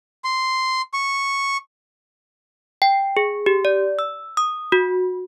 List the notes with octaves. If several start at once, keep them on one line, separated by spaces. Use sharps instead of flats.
C6
C#6
G5
G#4
G4
D5
E6
D#6
F#4